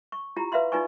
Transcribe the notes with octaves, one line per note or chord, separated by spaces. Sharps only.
C#6
E4 F4 G4 A#5
B4 E5 F5 B5 C6
D#4 F4 B4 D5 G#5 C#6